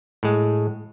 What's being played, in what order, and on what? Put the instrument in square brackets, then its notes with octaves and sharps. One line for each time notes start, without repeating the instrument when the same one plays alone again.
[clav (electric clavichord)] A2 G#3